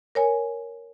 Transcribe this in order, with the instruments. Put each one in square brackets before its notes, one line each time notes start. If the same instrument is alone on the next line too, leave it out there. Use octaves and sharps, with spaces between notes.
[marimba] A#4 C#5 G#5